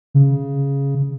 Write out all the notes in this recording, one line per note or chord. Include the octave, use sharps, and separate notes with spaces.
C#3